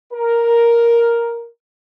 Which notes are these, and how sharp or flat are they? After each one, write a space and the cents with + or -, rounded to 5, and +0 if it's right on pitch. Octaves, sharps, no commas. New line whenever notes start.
A#4 +5